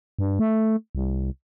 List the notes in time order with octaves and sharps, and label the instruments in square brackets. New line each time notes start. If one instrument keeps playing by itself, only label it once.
[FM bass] G2
A3
C2